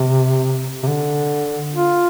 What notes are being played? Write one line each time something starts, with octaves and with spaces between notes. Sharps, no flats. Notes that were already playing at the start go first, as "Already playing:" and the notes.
Already playing: C3
C3
D3
F4